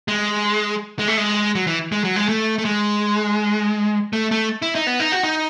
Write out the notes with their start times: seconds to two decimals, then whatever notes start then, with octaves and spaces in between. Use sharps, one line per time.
0.08 G#3
0.99 G#3
1.08 A3
1.17 G#3
1.55 F#3
1.67 E3
1.92 G#3
2.04 F#3
2.16 G#3
2.29 A3
2.58 A3
2.65 G#3
4.13 A3
4.31 A3
4.62 E4
4.75 D#4
4.87 B3
5.00 D#4
5.12 F#4
5.23 D#4